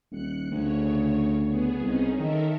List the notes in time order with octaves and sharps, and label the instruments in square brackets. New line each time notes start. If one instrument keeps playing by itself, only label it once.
[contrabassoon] D#1 [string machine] F#6 C#7
[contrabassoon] D2 [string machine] C#3 C#5
[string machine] B3 G#4
[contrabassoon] C2 [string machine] C#4 D#4 G#4
[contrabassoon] D#3 [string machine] A4 A#4 E5